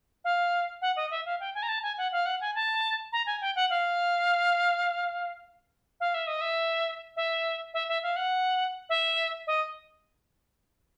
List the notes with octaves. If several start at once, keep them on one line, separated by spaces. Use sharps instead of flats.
F5
F#5
D#5
E5
F5
G5
G#5
A#5
A5
G#5
F#5
F5
F#5
G#5
A5
A#5
G#5
G5
F#5
F5
F5
E5
D#5
E5
E5
E5
E5
F5
F#5
E5
D#5